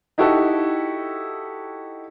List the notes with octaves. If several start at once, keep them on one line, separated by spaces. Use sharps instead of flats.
D#4 E4 F#4 G4 A4